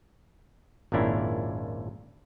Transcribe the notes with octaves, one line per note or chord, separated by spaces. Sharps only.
G#1 F2 A#2 C#4 D4 E4